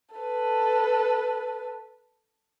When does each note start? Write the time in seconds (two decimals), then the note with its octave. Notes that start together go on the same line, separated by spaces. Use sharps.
0.16 A4 B4